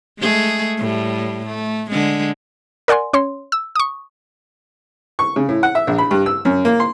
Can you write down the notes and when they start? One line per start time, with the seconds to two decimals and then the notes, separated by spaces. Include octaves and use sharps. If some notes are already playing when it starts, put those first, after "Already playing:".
0.19 G#3 A3 G#4
0.77 A2 G3
1.46 A3
1.90 D3 G#3
2.88 A#4 D5 F#5 G#5 C6
3.13 C#4 C#5 C6
3.52 E6
3.75 C#6 D#6
5.19 C#6
5.36 C#3
5.49 A2
5.63 F#5
5.75 E5
5.87 A#1
5.98 B5
6.11 G2
6.26 E6
6.45 F#2
6.65 A#3
6.80 C6